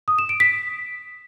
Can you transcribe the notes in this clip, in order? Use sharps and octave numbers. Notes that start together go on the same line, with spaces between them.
D#6
E7
D7
B6